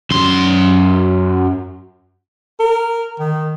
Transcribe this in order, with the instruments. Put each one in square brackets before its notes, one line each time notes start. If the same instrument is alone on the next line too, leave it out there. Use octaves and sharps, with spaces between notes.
[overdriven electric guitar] F#2 C6
[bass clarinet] A#4
D#3